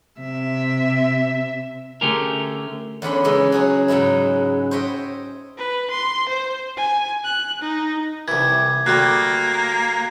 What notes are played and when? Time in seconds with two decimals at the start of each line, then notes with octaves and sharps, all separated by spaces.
0.19 C3 E5
2.01 D3 A3 C#4 G4 G#4 A#4
3.02 E2 D3 C#4 B5 C6
3.24 C#3 E3 G#3 D#4
3.52 F#3 G#4 C#5
3.88 G#2 C#3 F#3 G#3 E4
4.71 C5 C#5 D#5 E5 G5
5.58 B4
5.91 C6
6.29 C5
6.77 G#5
7.24 F#6
7.62 D#4
8.28 C2 E3 G#6
8.86 D2 G3 A#3 F#6